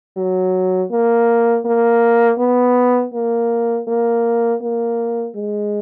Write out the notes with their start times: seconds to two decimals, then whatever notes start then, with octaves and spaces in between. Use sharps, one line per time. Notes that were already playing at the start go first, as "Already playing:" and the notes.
0.17 F#3
0.92 A#3
1.65 A#3
2.39 B3
3.14 A#3
3.88 A#3
4.62 A#3
5.35 G#3